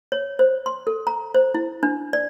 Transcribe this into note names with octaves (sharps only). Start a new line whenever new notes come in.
C#5
C5
C6
A4
A#5
C5
E4
D4
D5